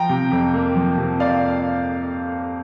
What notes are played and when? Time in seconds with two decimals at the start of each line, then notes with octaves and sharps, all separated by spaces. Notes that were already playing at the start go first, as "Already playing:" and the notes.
Already playing: F3 G5 A#5
0.09 C3
0.31 F2
0.54 A#3
0.75 F3
0.98 C3
1.20 D5 F5